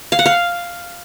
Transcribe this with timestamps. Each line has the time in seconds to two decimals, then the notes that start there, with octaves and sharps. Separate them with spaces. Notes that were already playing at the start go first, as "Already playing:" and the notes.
0.12 F5
0.19 F#5
0.26 F5